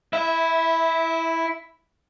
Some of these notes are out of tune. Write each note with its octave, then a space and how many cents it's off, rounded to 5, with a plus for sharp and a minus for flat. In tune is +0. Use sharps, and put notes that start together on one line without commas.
E4 +0 E5 -20